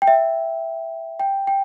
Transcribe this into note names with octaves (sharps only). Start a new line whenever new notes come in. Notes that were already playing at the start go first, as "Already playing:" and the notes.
G5
E5
G5
G5